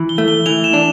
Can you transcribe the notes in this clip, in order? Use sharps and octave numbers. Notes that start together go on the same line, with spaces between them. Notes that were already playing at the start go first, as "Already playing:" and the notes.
Already playing: E3
G7
A3
G7
E3 F7
E7
D4